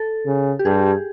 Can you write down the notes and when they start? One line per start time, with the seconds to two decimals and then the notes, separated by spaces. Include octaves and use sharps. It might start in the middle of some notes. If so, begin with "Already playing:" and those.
Already playing: A4
0.27 C#3
0.59 G4
0.65 G2 G#4